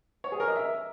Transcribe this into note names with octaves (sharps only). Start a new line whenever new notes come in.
C#5
G#4
A#4
D#5
E5